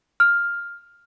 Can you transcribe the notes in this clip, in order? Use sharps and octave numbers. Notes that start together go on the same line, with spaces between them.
F6